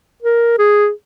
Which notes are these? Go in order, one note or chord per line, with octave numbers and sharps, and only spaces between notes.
A#4
G#4